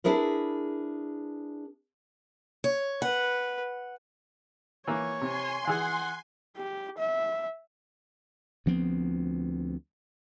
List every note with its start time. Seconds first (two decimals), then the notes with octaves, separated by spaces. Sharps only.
0.04 D4 E4 G#4 A#4 B4
2.64 C#5
3.02 B4 F#5
4.87 E3 A#3 C#5
5.21 C3 G#5 C6
5.67 E3 G#4 F#5
6.57 G4
6.98 E5
8.66 D2 F3 B3 C4